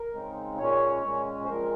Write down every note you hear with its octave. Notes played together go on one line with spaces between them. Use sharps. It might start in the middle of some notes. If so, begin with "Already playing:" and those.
Already playing: A#4
C#3 G#3 C4 D#4
A#2 G#3 C#4 C#5
A#2 G#3 C#4
C5
A#2 F3 G#3 C4 A#4